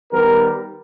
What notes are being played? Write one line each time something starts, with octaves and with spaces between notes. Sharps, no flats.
D#3 G3 B3 A#4